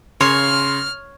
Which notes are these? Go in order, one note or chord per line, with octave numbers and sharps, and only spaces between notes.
C#3 C#5 C6 F6